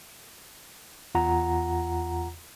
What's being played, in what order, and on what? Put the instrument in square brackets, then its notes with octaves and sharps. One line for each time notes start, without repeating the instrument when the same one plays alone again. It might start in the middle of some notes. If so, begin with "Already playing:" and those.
[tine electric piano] E2 F4 F#5 A#5